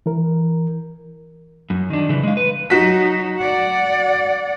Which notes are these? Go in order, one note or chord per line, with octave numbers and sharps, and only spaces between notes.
E3 A#4
F#2
D#3 D4
C#3 E3
G#3 F5
B4
F#3 D#4 F#4 B6
D5 F#5